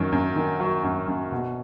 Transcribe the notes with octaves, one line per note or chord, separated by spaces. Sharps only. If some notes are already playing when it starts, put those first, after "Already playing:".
Already playing: F#2 D#3 F#3
F#2
D#3
F#3
F#2
F#2
B2